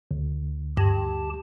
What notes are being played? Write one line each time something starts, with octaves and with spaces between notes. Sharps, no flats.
D2
G2 G4 A5